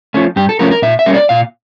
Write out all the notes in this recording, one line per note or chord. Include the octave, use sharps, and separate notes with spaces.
F3 A3 C#4
G2 G4
A4
F3 A3 C#4 A#4
A#4
A#2 E5
E5
G3 A#3 C#4
D5
A#2 F5